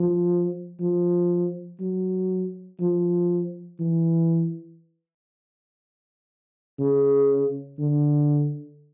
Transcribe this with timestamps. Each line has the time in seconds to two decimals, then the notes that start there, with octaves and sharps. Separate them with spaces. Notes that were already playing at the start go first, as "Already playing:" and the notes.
Already playing: F3
0.80 F3
1.80 F#3
2.80 F3
3.79 E3
6.79 C#3
7.79 D3